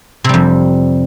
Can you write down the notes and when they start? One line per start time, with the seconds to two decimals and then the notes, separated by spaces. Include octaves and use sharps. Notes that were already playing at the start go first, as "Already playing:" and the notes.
0.24 C3
0.29 G3
0.34 F2